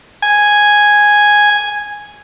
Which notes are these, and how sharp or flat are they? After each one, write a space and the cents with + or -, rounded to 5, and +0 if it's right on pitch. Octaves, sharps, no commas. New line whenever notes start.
G#5 +0